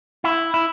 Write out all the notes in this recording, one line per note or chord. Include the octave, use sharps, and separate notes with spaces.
E4
E4